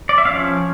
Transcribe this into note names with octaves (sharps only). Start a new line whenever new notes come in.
D5
E5
F3 C#4 F5